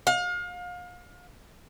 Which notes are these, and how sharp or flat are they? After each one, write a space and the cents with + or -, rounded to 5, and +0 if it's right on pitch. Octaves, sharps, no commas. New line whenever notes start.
F5 +35